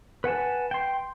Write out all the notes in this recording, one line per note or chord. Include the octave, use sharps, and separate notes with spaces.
B4 F#5 G#5 A5
G5 C6